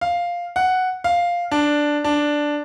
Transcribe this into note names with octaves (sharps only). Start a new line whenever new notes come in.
F5
F#5
F5
D4
D4